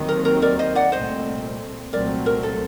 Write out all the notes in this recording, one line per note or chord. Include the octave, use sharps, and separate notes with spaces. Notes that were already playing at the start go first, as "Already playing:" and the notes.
Already playing: D#2 D#3 F#3 C4
A#4
A#4
A#4 D5
C5 D#5
D5 F#5
C2 A#2 A3 C4 C5 D#5
C2 A#2 F#3 A3 C4 A#4 D5
A#4
A4